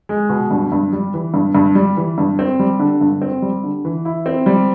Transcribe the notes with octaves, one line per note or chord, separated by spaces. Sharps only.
G#3
B2
G2
G2
G3
E3
G2
G2
G3
E3
G2
C4
G3
D3
G2
C4
G3
D3
E3
E4
C4
G3